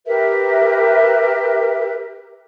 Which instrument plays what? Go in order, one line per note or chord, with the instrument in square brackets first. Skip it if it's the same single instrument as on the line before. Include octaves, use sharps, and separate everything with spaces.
[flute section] G4 A#4 B4 E5